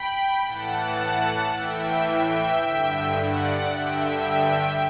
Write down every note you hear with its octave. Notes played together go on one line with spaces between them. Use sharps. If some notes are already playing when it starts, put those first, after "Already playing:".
Already playing: G5 B5
A2 E3 F#5 A5
A2 E3 E5 G5
E5 G5
G2 D3
D5 F#5
G2 D3 E5 G5